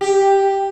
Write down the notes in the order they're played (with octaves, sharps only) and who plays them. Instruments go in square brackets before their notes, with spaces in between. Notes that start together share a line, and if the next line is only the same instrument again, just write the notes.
[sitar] G4